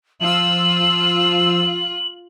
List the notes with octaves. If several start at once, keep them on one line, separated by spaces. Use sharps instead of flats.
F3 F4 E6 F#7